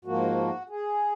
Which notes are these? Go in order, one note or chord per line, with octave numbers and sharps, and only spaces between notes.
G#2 F3 A#3 F#4
G#4